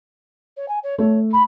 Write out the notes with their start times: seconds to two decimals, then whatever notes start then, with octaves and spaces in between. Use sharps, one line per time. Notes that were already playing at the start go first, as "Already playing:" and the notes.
0.57 C#5
0.68 G#5
0.83 C#5
0.98 A3 C#5
1.33 B5